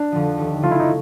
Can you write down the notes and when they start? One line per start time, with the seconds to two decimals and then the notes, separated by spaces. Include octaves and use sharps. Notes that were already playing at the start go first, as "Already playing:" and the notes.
Already playing: D4
0.12 F2 D3 F3
0.38 D#2
0.62 C#3 F3 A3 F4
0.71 E4
0.80 D#4